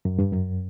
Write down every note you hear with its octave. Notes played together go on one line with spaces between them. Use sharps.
F#2
G2
F#2